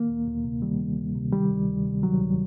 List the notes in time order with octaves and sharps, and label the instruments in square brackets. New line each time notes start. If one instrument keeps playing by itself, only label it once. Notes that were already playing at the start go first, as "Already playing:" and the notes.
Already playing: [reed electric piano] D#3 A#3
D2
D2
C3
D#3 G3
D2
D2
C3
D#3 G3
D2
D2
C3
D#3 F#3
D2